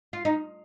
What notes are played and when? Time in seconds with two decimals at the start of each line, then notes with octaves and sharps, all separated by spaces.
0.13 F4
0.25 D#4